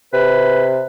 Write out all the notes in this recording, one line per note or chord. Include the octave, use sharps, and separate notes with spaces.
C3 B4